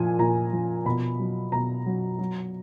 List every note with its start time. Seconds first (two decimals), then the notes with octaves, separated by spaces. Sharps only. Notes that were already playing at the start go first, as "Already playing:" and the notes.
Already playing: A#2 F3 G#5
0.19 A#2 A#5
0.53 F3
0.85 B2 B5
1.19 F#3
1.52 B2 A#5
1.86 F#3
2.19 F#3